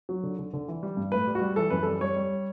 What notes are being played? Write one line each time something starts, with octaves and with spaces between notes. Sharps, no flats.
F#3
D3
D3
D3
E3
G3
G2
A2 B4
G3
F#4
G3
E3 A4
F#2 B4
G3 A4
G3 C#5
G3